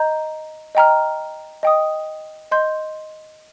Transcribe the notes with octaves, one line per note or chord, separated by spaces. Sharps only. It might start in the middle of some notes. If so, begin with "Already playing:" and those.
Already playing: D#5 A#5 G6
D#5 G5 A#5 F6
D#5 G5 D#6
D#5 C6 G6